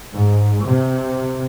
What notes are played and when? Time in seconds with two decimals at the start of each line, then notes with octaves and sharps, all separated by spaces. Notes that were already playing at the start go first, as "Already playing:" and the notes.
0.15 G#2
0.67 C3